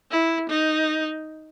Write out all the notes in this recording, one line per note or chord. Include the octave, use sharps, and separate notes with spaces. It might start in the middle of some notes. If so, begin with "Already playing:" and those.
E4
D#4